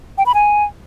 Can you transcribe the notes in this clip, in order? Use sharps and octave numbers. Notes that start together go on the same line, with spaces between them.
G5
B5
G#5